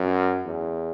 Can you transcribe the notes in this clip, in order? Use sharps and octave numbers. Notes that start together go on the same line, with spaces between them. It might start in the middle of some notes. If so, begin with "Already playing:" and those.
Already playing: F#2
E2